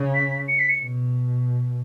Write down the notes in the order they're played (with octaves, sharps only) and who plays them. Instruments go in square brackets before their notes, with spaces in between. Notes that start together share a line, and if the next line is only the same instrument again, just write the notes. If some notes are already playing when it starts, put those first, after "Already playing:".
Already playing: [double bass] C#3
[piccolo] B6
C#7
B6
C#7
[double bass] B2